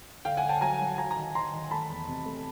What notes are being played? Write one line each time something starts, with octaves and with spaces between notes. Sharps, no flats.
D3 F5 G5
F#5 G#5
D3
G5 A5
F#3 G#5 A#5
F#3
F#3 G#5 A#5
G#5 A#5
D#3
D#3 A#5 C6
D#3
A3 A5 B5
E2
C3
A3